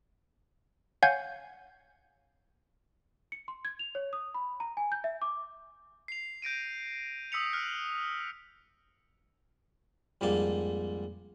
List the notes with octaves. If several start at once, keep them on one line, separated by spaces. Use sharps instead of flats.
C#5 F5 F#5 G#5 G6 G#6
C#7
C6
G#6
F7
C#5
D#6
B5
A#5
G#5
G6
E5
D6
C7 F7
G6 A#6 D7 D#7
D#6 E6 B6 C#7 F7
F6 F#6
F2 G#2 G3 A#3 A5